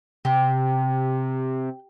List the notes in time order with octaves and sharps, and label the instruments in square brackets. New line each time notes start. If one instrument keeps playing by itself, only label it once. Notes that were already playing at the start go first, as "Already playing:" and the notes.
[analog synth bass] C3 [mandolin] G4